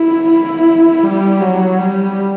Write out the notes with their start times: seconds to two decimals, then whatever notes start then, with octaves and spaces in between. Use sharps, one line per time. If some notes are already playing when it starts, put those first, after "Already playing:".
Already playing: E4
0.29 E4
1.03 G3
1.41 F#3
1.78 G3